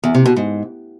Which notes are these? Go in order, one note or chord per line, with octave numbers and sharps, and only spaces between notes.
E2
C3
B2
G#2